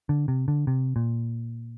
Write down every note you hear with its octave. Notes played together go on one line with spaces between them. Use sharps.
D3
C3
D3
C3
A#2